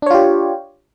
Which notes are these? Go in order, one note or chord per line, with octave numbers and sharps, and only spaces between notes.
D4 F4 G4 C#5